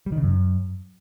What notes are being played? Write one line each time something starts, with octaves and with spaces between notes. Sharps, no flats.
G3
D#3
C#3
F#2